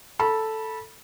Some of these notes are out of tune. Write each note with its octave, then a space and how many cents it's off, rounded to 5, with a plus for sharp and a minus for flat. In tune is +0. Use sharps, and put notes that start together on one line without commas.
A4 +0 B5 -20